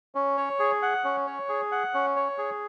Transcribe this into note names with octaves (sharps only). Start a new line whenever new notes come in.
C#4
C#5
G#4
F#5
C#4
C#5
G#4
F#5
C#4
C#5
G#4